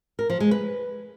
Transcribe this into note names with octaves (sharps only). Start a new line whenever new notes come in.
A#4
F3
G#3
B4